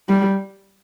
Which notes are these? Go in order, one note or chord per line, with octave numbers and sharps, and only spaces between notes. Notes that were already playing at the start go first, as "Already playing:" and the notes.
G3